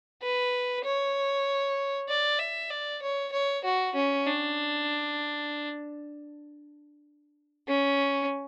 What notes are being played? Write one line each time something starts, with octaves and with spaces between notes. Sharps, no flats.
B4
C#5
D5
E5
D5
C#5
C#5
F#4
C#4
D4
C#4